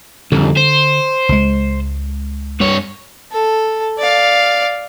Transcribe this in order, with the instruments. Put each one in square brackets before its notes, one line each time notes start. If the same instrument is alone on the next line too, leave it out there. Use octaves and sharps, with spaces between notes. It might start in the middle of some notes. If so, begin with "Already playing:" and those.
[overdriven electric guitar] C2 F2 [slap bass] D3
[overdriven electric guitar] C5
[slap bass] C#2 G#3
[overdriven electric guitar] G2 C#5
[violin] A4
D5 F5